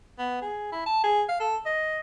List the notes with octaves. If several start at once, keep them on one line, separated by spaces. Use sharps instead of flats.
B3
G#4
E4
A5
G#4
F5
A4
D#5